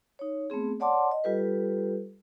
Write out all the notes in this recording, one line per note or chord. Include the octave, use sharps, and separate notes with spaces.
D#4 C#5
A3 B3 C4 G#4
C#5 D5 F#5 A5 C6 D6
D#5
G3 F4 G4 A4 B4